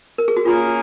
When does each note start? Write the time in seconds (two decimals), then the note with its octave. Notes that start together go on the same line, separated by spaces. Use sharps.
0.18 A#4
0.28 G#4
0.37 F#4
0.45 A#3 C#4 F4 G#4